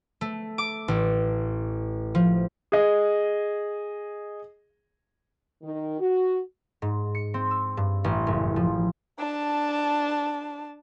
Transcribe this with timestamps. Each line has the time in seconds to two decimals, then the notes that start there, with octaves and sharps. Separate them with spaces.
0.21 A3
0.58 D6
0.88 A1
2.15 F3
2.72 G#4 D#5
5.62 D#3
5.99 F#4
6.82 G#2
7.15 C#7
7.34 C4
7.51 E6
7.77 G2
8.04 A1
8.27 F#1
8.56 F3
9.18 D4 A5